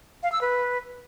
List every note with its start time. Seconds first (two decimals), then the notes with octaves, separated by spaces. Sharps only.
0.23 F5
0.32 E6
0.41 B4